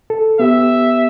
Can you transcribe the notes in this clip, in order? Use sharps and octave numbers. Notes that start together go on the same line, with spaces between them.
A4
B3 G4 E5